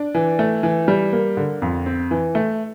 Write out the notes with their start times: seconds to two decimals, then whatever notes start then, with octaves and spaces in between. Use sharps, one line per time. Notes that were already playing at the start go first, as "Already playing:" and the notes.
Already playing: D4
0.15 E3
0.39 A3
0.63 E3
0.88 G3
1.12 A#3
1.37 D3
1.62 F2
1.86 C4
2.11 E3
2.35 A3